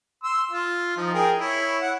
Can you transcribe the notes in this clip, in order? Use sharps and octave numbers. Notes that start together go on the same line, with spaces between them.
C6 E6
F4
F3 D#4
G#4 A#4 G5
E4 C#5
F#5